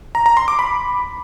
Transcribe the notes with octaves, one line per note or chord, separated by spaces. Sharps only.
A#5
A#5
C6
D6
B5